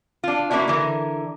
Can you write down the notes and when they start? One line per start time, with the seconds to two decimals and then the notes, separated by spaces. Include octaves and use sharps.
0.24 D4 F4
0.51 A#3 C4 C#4 E4 F#4
0.68 D3 E3 A#4